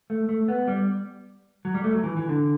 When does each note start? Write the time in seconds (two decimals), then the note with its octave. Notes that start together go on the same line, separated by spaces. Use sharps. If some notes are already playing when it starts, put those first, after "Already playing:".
0.10 A3
0.29 A3
0.48 B3
0.68 G3
1.65 F#3
1.74 G3
1.84 A3
1.94 F#3
2.04 E3
2.17 E3
2.29 D3